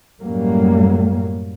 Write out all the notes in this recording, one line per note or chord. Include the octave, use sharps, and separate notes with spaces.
F#2 A2 F#3 G3 A#3